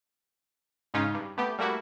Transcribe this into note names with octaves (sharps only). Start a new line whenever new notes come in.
G#2 C#3 G#3 C#4 D#4 F4
G2
A3 B3 G4
G3 A3 A#3 E4 F#4